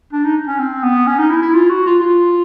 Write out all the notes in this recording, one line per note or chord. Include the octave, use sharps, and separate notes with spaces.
D4
D#4
C#4
C4
B3
C#4
D#4
E4
E4
F4
F#4
F4
F4